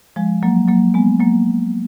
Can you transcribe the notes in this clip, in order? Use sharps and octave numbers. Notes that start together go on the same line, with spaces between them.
F3 G#3
F#3 A#3
F#3 A#3
G#3 B3
F#3 A#3